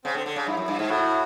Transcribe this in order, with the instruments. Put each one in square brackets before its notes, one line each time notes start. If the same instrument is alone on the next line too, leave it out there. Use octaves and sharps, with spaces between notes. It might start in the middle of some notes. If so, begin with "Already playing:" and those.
[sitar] C#3 [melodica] C4
[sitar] D3 [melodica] C4
[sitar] D3
[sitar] C#3 [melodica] D4
[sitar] G2 [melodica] E4
[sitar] F#2
G2
G#2
[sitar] A2 [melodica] E4 F#4